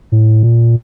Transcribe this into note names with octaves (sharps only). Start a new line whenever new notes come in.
A2
A#2